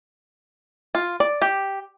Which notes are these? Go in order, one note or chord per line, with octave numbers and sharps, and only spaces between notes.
F4
D5
G4